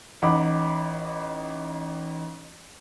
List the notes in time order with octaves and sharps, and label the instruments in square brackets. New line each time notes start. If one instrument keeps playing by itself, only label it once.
[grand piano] A1 D#4 F#5 B5 D6